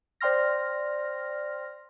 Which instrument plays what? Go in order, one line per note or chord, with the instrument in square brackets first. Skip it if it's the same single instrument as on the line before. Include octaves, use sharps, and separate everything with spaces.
[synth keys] C5 D5 G5 C6 F6 A#6